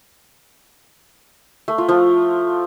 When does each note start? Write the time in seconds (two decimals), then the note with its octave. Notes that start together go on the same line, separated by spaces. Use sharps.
1.68 A3
1.78 F4
1.89 F3